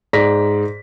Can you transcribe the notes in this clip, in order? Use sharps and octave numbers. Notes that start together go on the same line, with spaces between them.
G#2 D5 A#6 B6